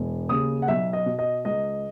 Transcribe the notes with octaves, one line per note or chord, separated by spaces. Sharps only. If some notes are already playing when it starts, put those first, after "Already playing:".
Already playing: E1
D#2 C#3 D#6
F#5
B1 E5
D#5
B2
D#5
C#2 D#5